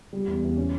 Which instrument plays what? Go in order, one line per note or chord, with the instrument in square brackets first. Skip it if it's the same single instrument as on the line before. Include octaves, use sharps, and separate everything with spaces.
[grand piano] G3
E2
E2
C#4